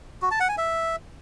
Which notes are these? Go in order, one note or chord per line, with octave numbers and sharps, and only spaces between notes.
F#4
A5
F#5
G#5
E5